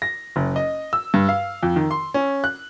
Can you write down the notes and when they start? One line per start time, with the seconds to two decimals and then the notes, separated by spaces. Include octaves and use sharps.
0.02 A#6
0.36 F#1
0.56 D#5
0.93 E6
1.14 G2
1.29 F5
1.63 F2
1.76 D#3
1.91 C6
2.14 C#4
2.44 F#6